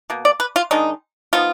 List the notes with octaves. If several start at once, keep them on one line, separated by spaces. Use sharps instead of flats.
B2 A#3
D5
B4
F4
D#3 G#3 D4 D#4
F3 B3 D#4 F4